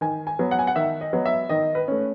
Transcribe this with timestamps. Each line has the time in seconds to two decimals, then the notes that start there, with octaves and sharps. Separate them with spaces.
0.01 D#3 G#5
0.27 G#5
0.39 F#3 B3
0.51 F#5
0.59 G#5
0.67 F#5
0.76 D#3 E5
1.01 D#5
1.13 F#3 B3
1.26 E5
1.49 D#3 D#5
1.75 B4
1.88 A3 C#4